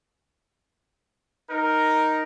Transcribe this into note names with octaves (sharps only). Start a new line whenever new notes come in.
D#4 A#4